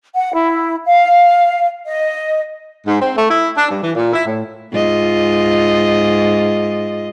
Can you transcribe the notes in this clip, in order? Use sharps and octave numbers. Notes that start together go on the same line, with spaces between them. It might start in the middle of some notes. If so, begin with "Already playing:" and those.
F#5
E4
F5
D#5
G#2
C4
A3
E4
D4
G2
E3
A#2
E4
A2
G#2 F4 D#5